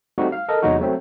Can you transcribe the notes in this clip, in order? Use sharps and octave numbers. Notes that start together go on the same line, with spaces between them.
G3 A3 C4 D#4 F#4
F5
A4 A#4 D#5
E2 C3 F#3 G#3 D#4 F#4
F#3 A3 C4